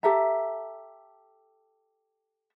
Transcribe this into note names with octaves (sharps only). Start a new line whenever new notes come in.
G4 A4 E5 A#5